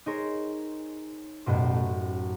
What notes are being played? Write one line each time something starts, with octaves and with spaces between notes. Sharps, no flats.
D#4 G#4 A#4 C5 C#5
A1 F#2 B2 C5
A3